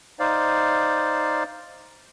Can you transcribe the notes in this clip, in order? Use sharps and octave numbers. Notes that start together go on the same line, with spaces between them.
D#4 C5 D5 F5